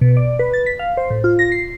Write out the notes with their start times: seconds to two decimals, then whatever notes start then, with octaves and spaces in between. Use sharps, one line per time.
0.01 B2
0.17 D5
0.39 B4
0.53 A6
0.66 B6
0.79 F5
0.97 C5
1.10 A2
1.24 F4
1.39 A#6
1.52 C7